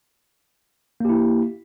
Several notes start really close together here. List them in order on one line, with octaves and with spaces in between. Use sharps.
A#3 G4 E4